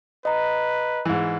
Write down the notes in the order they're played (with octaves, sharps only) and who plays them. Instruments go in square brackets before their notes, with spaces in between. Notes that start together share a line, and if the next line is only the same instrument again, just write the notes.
[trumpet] B4 [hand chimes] D#5 A#5
[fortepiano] G#2 E3